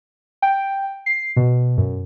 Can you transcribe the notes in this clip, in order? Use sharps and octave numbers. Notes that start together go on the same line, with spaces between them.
G5
C7
B2
F#2